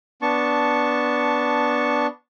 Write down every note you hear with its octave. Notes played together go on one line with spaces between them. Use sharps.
B3 D4 A5 C#6